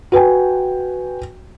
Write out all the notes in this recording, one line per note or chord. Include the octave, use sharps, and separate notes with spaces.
F#4 B4 G5 G#5